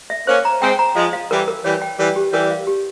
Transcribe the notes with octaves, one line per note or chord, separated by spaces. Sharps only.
E5
A#3 C#4 C5
A#5
G#3 C4 G5
A#5
F3 G#3 F5
F5
E3 G3 A#4
A#4
E3 G3 C#5
G5
E3 G3 A#4
G4
E3 G3 A#4
F5
G4